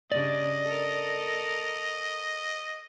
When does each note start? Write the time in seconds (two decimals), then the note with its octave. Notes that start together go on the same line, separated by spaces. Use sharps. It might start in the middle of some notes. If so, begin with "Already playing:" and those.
0.12 G2 C#3 D4 D5 D#5
0.64 A4 A#4